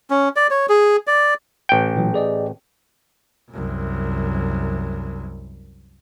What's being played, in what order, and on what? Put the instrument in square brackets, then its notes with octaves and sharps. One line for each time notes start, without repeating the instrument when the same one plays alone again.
[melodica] C#4
D5
C#5
G#4
D5
[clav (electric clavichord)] A1 G5
[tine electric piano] A#2 E3 F#3
G#4 D5 D#5
[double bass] C2 F#2